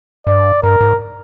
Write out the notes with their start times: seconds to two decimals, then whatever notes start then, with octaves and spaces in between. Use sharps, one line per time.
0.27 G2 D5
0.63 G2 A#4
0.81 G#2